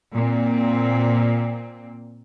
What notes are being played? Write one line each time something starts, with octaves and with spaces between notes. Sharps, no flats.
A#2 C4